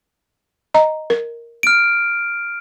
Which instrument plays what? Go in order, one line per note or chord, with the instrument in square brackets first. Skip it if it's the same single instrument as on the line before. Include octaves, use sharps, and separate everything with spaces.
[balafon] D#5 A#5
A#4
[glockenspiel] F6 D7